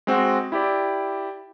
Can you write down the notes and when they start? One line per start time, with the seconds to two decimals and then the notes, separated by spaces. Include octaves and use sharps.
0.07 G#3 C4 F#4
0.52 E4 G4 D5